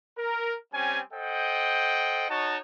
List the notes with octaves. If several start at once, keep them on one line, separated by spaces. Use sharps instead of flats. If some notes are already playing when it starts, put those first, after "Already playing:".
A#4
G3 C4 C#4 G#5
A4 C5 D#5 F#5 G5
D#4 F#4 C#5 D#5 A5